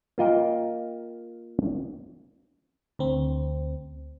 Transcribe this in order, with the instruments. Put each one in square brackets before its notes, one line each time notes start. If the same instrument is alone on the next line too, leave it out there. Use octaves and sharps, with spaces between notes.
[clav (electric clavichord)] A#3 F4 D#5 G5
[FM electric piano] D2 C4